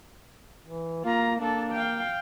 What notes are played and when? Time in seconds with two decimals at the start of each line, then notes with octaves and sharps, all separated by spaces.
0.65 E3
1.04 A#3 F4 A#5
1.40 A#3 D4 A4
1.73 F5 G5